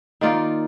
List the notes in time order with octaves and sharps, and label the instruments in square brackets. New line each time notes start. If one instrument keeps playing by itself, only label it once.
[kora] D#3 A#3 F4 D5